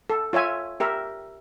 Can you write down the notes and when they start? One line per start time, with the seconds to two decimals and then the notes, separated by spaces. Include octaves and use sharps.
0.10 A4
0.33 F4 C#5 E5 G#5
0.80 G4 A#4 E5